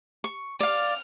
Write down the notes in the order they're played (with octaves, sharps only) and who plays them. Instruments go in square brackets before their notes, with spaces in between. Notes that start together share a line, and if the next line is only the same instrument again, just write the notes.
[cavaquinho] C#6
[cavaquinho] D5 F5 [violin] F6